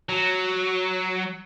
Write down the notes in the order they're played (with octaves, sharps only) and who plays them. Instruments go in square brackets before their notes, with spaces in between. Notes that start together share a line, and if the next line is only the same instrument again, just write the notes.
[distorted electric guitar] F#3